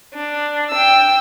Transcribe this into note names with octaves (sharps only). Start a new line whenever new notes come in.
D4
G5 E6